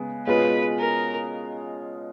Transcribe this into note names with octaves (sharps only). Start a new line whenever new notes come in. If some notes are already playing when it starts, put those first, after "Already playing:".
Already playing: C#3 G#3 B3
B2 G#3 C#4 F4 G#4 B4
A#4